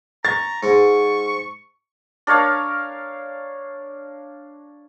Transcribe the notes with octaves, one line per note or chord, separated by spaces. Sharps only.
A#5 C#6 A6
G#2 C#6
D4 A#4 C#5 F5